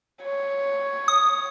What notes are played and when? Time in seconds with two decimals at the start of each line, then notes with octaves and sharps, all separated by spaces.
0.23 C#5
1.08 D#6